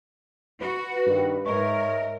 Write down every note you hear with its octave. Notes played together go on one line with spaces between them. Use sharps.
F#4 B4
G2 D#3
G#2 A#4 C#5 D#5 E5